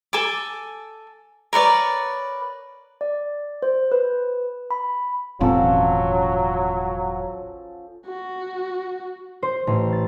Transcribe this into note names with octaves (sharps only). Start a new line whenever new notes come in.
A4 G#5 D6
A#4 B4 C#5 D5
D5
C5
B4
B5
E1 A1 F3 F#3 C4 C#4 A4
F#4
C5
A1
A6